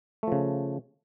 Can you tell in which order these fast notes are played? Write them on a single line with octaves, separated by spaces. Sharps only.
A3 F3 C#3